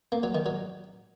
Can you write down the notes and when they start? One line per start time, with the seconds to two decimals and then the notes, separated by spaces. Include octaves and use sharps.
0.12 A#3
0.23 F#3
0.35 D#3
0.46 F#3